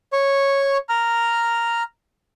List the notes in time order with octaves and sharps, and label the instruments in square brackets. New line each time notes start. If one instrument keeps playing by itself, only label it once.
[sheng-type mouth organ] C#5 C#6
A#5 F6